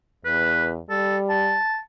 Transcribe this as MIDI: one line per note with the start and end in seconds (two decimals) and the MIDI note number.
0.25 0.79 40
0.25 0.67 71
0.90 1.57 55
0.90 1.16 69
1.29 1.78 81